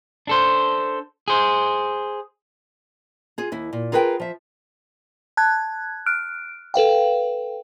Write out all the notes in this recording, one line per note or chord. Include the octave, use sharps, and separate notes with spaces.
D4 A4 C5
G#4 C5
F4 G#4
D#2 E4
A#2
F4 G#4 A#4 B4 D5 G5
F3 E5
A5 F#6 G#6
F6 F#6 D7
A4 B4 F5 G5